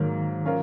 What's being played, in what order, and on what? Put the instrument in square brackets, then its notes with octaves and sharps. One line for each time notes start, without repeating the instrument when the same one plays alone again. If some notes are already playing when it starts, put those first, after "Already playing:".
Already playing: [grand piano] G#2 F#3 A#3 [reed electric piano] D#3
[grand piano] F#3 C#4 F4 A#4